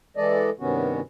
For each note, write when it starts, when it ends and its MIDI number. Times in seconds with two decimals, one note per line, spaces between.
0.17 0.50 52
0.17 0.50 56
0.17 0.50 69
0.17 0.50 74
0.17 0.50 75
0.60 1.00 43
0.60 1.00 48
0.60 1.00 51
0.60 1.00 59
0.60 1.00 61
0.60 1.00 66